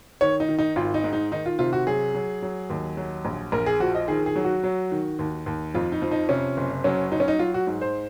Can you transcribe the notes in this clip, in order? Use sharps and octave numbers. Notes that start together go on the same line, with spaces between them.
D#3 C#5
D#4
D#3
D#4
G#1 F4
D#4
G#2
D#4
D#3 D#4
F4
C3 F4
F#4
F#3 G#4
F#3
F#3
D#2
F#3
A#1
A#1 A#4
G#4
F3 F#4
D#5
D#3 G#4
G#4
F#3
F#4
F#3
D#3
D#2
D#2
F2 F4
D#4
F3
D#4
C3 C#4
F#1
F#3 C#4
F#3 D#4
C#4
D#4
F#3 F4
F#4
G#2
C5